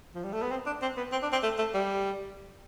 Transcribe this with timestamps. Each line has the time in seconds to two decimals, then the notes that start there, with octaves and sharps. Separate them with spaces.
0.15 F3
0.24 G3
0.33 A3
0.42 B3
0.51 C4
0.66 D4
0.82 C4
0.97 B3
1.12 C4
1.22 D4
1.32 C4
1.43 A3
1.58 A3
1.74 G3